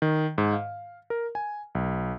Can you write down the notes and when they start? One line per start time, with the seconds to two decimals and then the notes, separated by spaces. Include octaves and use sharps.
0.02 D#3
0.38 G#2
0.53 F5
1.10 A#4
1.35 G#5
1.75 B1